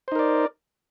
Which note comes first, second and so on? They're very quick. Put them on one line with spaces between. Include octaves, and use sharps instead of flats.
C5 D#4 A#4 D5